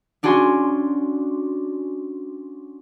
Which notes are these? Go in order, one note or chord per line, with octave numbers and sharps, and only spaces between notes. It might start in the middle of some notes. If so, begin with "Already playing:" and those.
C#4 D4 F#4 G#5 C6